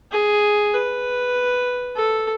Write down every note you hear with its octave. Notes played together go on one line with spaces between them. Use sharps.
G#4
B4
A4